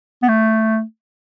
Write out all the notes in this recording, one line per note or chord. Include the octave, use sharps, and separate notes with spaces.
B3
A3